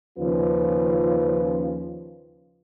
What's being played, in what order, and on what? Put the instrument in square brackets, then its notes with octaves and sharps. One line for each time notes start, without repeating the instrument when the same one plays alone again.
[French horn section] D#2 C#3 F3 C#4 F4 B4